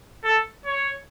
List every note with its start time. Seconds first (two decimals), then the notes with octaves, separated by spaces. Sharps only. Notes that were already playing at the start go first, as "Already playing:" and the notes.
0.24 A4
0.65 C#5